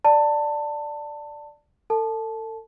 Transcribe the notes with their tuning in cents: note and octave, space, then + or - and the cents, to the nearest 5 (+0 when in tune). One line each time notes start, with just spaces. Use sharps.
D5 +0 A5 +20
A4 +35 A5 -15